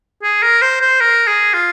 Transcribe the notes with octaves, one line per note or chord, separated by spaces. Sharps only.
G#4
A#4
C5
C5
A#4
G#4
F4